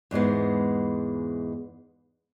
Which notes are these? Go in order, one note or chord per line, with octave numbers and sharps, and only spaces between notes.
E2 G#2 G#3 B3